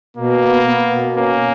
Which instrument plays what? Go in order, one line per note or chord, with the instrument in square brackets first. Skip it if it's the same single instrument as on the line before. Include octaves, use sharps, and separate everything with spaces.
[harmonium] B2 [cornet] A#3
[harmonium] B3
B3
B2
[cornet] A#3 [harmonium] C#4